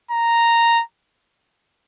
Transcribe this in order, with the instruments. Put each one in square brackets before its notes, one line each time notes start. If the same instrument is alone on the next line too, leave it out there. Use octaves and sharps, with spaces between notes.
[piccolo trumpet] A#5